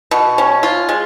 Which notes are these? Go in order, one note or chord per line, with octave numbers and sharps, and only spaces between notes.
B2
C#4
F4
G#3